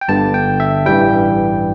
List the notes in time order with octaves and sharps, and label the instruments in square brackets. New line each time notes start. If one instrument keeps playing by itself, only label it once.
[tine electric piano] G5
G1 G2 D3 A5
G5
E5
A1 G2 E3 G3 G5